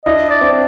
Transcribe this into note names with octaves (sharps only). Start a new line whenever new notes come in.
D4 E4 D#5
D5
C4 D4